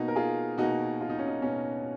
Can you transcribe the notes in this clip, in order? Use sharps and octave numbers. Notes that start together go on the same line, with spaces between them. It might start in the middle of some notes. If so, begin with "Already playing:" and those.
Already playing: B2 A#3 D#4 F#4
A#4
F4 G#4
B2 A#3 D#4 F#4
F4
D#4
C#4
D#4
B2 C#4